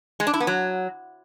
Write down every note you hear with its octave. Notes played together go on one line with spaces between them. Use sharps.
G#3
D4
E4
B3
F#3